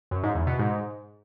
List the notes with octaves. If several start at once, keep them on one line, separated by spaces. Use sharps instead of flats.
F#2
G#2
E2
B2
G#2